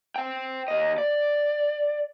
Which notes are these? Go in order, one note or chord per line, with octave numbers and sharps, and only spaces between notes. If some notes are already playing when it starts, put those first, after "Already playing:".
C5 G5
D#2 D#5
D5